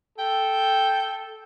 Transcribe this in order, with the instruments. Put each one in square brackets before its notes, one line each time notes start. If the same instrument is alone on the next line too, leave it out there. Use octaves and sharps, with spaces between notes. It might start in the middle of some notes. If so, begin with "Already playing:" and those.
[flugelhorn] A4 [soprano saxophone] G5